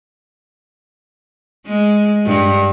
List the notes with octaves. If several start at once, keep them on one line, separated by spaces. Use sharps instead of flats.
G#3
G2